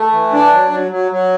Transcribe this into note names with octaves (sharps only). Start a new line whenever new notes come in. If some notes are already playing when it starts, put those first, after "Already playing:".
Already playing: A3
E3
D4
F#3
F#3
F#3
F#3